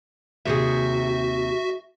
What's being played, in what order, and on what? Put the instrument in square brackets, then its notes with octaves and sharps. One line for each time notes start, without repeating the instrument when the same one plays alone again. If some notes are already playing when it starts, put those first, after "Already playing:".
[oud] D#2 C3 G#4 [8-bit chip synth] F#4 E5